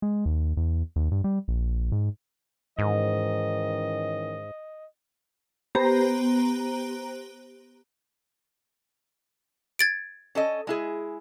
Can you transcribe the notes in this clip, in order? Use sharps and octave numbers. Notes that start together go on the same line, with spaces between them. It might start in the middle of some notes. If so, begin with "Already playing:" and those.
G#3
D#2
E2
D#2
G2
G3
A#1
G#2
G#2 D#3 E3 C#4 D#5
B3 G4 C5 A#5
G#6 A6 D7
C#4 A4 D#5
G#3 E4 G#4